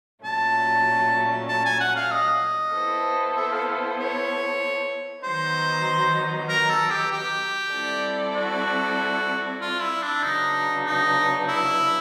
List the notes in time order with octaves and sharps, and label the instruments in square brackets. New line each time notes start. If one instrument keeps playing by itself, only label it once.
[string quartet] A#2 F#3 A3 C#4 [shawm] A5
[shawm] A5
G#5
F#5
F5
D#5
[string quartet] B3 E4 A4 C5
[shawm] E5
F5
C#5
[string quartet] D#3 F#3 B3 D#4 [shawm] C5
[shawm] A#4
A4
G4
G4
[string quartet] G3 C4 E4 A4 D5
[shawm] F#4
F4
E4
D4
[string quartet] C#3 F#3 B3 D4 [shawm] D#4
[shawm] D#4
E4